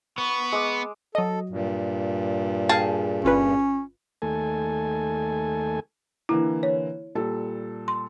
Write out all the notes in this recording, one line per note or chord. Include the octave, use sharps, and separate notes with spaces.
B3 C#6
G#3 D6
F#3 A4 D#5
G2 A#2
G#4 F5 G5 A5
G1 C#4 F4 B4
D#2 A3 A4 G#5
D3 E3 A#3 E4
C#5
A#2 G3 A4
C6